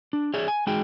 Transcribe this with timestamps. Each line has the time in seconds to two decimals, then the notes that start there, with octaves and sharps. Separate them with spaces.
0.13 D4
0.34 G#4 C#5 D5 E5
0.48 G#5
0.67 G#3 D#4 F#4 G#4 G5